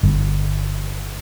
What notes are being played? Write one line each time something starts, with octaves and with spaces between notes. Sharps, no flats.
G1